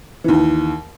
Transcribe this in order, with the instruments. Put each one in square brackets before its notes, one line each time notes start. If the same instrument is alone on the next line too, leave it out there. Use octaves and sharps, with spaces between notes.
[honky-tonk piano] D#2 E3